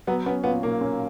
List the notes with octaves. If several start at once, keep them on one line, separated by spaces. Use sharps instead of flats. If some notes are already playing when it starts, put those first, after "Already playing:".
F#3 B3
B3 C#4
A#2 B3
B1 A#3
C#4